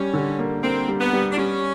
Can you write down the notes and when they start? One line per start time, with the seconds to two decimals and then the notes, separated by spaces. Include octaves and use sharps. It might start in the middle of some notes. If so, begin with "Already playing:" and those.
Already playing: G3 C#4
0.13 D3
0.39 A#3
0.63 A#3 C4
0.88 G3
1.01 B3
1.13 G3
1.32 D4
1.38 G3 C#4